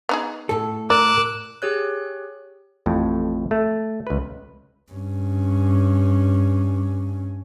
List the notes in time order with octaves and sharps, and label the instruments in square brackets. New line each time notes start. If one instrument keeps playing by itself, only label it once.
[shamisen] B3 D#4 G#4
[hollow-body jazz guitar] A2 A4
[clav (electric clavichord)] A#4 [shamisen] D5 [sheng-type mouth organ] D6 E6 F#6
[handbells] G4 G#4 C#5 F#6
[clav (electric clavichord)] A1 F2 A2
A3
C#2 B4
[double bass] G2 C#4